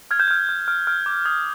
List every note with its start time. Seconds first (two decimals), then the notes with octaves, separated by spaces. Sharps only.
0.11 F6 G#6
0.20 G6
0.28 F6 G#6
0.49 F6
0.68 F6
0.87 F6
1.06 D6
1.25 D#6 G#6